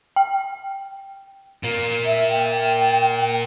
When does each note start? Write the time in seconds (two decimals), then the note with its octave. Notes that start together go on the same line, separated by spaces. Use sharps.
0.16 G5
1.63 A#2 A#3
2.06 E5
2.30 G5